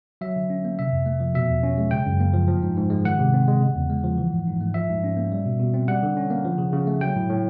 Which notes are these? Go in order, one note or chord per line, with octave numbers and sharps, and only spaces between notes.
F#3 E5
D3
C#4
A#3
C3 E5
F2
A3
F3
B2 E5
E2
C#4
G#3
C#3 G5
F#2
A#3
F3
F3
G#2
G#2
G#3
D#3 F#5
C3
C4
G#3
C#3
E2
G#3
F3
E3
G#2
G#2
A3
F3 E5
G#2
C#4
A#3
G3
B2
B2
C4
G3 F#5
D3
C#4
A#3
F3
C#3
C#3
A3
F#3 G5
A2
A2